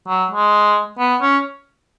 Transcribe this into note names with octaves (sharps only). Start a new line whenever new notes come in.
F#3
G#3
B3
C#4